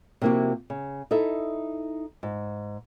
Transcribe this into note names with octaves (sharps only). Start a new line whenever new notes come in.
C3 F3 A#3 E4 F#4
C#3
D#4 E4 A4 E5
G#2